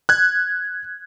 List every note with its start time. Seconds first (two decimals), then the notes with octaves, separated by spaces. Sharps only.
0.09 F#6 G#6